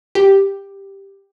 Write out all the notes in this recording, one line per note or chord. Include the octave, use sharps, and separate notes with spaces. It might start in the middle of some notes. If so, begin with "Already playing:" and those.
G4